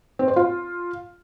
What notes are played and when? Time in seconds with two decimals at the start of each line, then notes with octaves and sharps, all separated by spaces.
0.19 C4
0.28 C5
0.36 F4